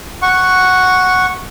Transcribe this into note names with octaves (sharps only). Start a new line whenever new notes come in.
F#5 C#6